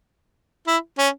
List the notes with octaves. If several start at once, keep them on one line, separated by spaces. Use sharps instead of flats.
E4
C#4